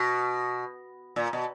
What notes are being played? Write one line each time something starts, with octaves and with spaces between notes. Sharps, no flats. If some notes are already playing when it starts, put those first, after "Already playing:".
Already playing: B2
A#2
B2